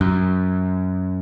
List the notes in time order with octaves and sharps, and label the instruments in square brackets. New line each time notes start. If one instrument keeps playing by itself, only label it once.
[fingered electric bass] F#2